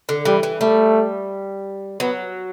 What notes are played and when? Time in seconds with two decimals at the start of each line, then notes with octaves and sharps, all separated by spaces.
0.09 D3
0.25 E3 G3
0.43 E3
0.61 G3 A3
2.00 F#3 B3